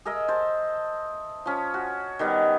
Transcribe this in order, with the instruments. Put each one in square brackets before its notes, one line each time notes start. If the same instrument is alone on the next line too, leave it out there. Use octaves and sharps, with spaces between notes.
[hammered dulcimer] G#4 A#4 D#5 E5
C5 A5
F3 C#4
F#4
D#3 G3 B3